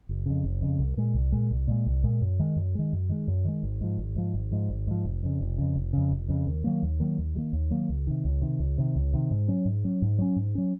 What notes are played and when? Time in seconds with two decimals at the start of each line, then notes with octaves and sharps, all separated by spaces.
0.09 F#1
0.26 F2 C#3
0.44 F#1
0.62 F2 C#3
0.79 C2
0.97 A#2 G#3
1.14 C2
1.32 A#2 G#3
1.51 C2
1.67 A#2 G#3
1.86 C2
2.04 A#2 G#3
2.21 F#2
2.40 D#3 G#3
2.56 F#2
2.75 D#3 G#3
2.93 F#2
3.09 D#3 G#3
3.28 F#2
3.45 D#3 G#3
3.63 G#1
3.81 G#2 F3
3.98 G#1
4.16 G#2 F3
4.34 G#1
4.52 G#2 F3
4.69 G#1
4.87 G#2 F3
5.05 F1
5.23 F2 C#3
5.41 F1
5.58 F2 C#3
5.75 F1
5.93 F2 C#3
6.11 F1
6.28 F2 C#3
6.46 D#2
6.64 D#3 F#3 A#3
6.82 D#2
7.00 D#3 F#3 A#3
7.18 D#2
7.35 D#3 F#3 A#3
7.53 D#2
7.70 D#3 F#3 A#3
7.89 C#2
8.07 C3 D#3
8.25 C#2
8.41 C3 D#3
8.59 C#2
8.78 C3 D#3
8.96 C#2
9.13 C3 D#3
9.31 G#2
9.48 F#3 C#4
9.65 G#2
9.84 F#3 C#4
10.02 G#2
10.18 F#3 C#4
10.36 G#2
10.55 F#3 C#4